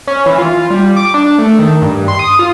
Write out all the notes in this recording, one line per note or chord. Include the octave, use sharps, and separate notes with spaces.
C#4
E3
F4
G3
D6
D4
A3
D#3
G2
C6
D#6
F4